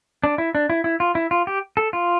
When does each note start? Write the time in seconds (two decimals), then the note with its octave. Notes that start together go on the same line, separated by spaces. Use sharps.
0.24 D4
0.38 E4
0.55 D4
0.70 E4
0.84 E4
1.00 F4
1.15 E4
1.31 F4
1.47 G4
1.77 A4
1.93 F4